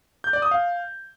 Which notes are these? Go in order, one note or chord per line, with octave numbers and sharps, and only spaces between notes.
G6
D5
D#6
F5